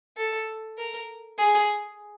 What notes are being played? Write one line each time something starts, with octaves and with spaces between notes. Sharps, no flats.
A4
A#4
G#4